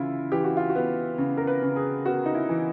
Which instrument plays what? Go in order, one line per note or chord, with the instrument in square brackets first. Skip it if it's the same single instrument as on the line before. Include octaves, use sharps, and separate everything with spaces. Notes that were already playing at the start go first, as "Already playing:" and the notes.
Already playing: [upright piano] C#3 E3 E4 F4
E3 G4
F#4
F4
F#4
B3
C#3
A#4
B4
C#3
G#4
B3 F#4
D#4
E4
E3